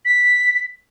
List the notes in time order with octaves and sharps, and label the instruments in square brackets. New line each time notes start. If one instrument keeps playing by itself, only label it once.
[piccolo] B6